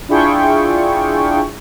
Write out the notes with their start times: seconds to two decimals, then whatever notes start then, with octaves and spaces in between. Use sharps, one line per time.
0.09 D4 E4 F4 G#4 G5 C#6